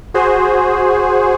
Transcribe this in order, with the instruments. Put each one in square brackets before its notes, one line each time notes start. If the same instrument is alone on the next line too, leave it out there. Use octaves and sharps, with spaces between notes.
[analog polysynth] F#4 G#4 C5